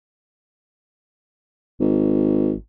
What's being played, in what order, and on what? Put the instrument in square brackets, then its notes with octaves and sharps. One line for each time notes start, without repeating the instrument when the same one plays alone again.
[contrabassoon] G#1